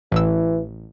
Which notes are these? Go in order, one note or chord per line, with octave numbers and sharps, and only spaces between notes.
A1 E3 E6